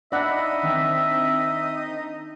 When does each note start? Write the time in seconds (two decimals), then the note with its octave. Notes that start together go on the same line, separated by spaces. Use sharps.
0.12 D4 D#4 D5 E5 F#5 B5 E6
0.63 D#3 C4 D4